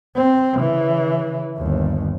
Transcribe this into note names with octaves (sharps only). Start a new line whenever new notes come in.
C4
C#3 E3
G1 D#2